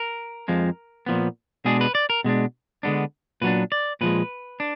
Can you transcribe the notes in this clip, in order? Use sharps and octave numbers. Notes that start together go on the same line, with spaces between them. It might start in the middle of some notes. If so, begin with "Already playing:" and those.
Already playing: A#4
F2 F3 G#3
A#2 F3 B3
B2 G#3 D4 G#4
B4
D5
A#4
B2 G#3 D4
D3 G#3 B3 D4
A#2 F#3 B3 D4 B4
D5
A#2 F3 G#3 B4
D4